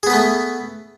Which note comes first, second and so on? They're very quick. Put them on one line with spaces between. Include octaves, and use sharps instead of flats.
G#4 B3 B4 A3